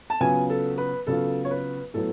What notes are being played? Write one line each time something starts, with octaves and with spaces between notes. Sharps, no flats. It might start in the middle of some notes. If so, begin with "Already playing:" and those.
A5
C#3 F#3 B3 F4 G#5
A4
B4
C#3 F#3 B3 F4 A4
C#5
B4
A2 F#3 B3 A4